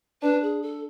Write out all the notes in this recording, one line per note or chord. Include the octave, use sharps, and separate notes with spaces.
D4 B4
G#4
A4